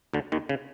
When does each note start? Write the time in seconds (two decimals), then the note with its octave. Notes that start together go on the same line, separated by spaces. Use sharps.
0.14 D2 D3
0.32 D#2 D#3
0.49 C#3